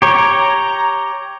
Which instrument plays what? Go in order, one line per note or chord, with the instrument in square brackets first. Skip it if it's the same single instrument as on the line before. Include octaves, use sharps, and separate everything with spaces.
[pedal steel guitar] G4 C#5 [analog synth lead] A#5